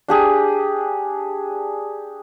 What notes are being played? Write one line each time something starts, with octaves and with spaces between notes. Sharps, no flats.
D4 G4 G#4